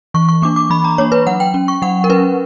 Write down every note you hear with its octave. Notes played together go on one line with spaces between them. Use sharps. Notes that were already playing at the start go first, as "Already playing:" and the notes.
E3 C#6
C#6
A#3 D4 D6
D6
E3 B5
A#5
A#3 D4 C#5
B4
F#3 F#5
G5
C#4
C#6
F#3 F#5
A#4
C#4 B4